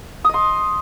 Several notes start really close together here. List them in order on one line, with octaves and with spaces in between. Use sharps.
D#6 D#5 C6